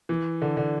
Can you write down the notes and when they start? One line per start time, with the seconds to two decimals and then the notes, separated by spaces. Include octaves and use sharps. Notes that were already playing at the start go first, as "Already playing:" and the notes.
0.09 E3
0.42 D3
0.57 D3